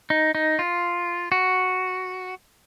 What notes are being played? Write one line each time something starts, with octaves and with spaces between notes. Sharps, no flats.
D#4
D#4
F4
F#4